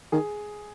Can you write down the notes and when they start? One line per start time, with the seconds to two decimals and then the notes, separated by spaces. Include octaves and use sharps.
0.12 D#3 G#4